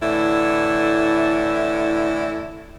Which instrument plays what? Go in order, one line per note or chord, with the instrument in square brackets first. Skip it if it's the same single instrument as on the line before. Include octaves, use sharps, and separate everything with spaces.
[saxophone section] A2 D3 E3 E4